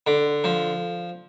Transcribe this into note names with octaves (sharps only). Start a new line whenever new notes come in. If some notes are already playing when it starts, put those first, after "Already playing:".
D3
F3